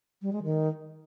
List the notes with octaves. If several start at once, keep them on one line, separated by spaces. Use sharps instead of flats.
G3
G#3
D#3